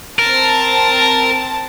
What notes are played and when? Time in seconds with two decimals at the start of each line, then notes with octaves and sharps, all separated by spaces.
0.19 C4 A#4 A5